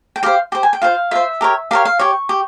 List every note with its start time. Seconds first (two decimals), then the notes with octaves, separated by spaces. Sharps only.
0.16 G5
0.23 G4 C5 F5
0.52 G4 C5 G5
0.63 G#5
0.73 G5
0.82 F4 C5 F5
1.11 F4 C5 E5
1.41 G4 A#4 C#5
1.71 G4 A#4 C#5 F5
1.85 F5
1.99 G4 C#5 C#6
2.29 G4